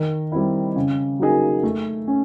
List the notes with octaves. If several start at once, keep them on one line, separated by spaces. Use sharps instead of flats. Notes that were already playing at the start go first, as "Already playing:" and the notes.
Already playing: D#3
G3 C4 E4
C#3
F#3 A#3 D#4 G#4
A3
C#4